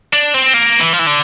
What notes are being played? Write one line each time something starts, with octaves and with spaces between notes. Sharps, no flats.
D4
C4
A#3
E3
F3
E3
D3